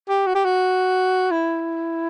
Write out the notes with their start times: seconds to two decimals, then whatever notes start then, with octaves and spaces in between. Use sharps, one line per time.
0.09 G4
0.26 F#4
0.35 G4
0.44 F#4
1.31 E4